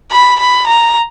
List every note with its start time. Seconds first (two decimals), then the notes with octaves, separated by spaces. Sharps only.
0.11 B5
0.39 B5
0.67 A#5